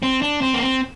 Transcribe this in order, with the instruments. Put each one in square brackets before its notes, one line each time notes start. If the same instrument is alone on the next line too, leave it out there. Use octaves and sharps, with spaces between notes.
[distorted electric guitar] C4
D4
C4
A#3
C4